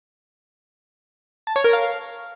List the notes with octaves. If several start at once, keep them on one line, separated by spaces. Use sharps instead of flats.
A5
C#5
A#4
F5